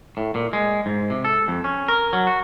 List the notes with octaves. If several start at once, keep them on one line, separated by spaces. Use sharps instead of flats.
A2
A#2
G#3
G#2
C3
A4
F2
C#4
A#4
F#3
F#4